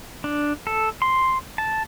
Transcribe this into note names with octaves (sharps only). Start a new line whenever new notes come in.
D4
A4
C6
A5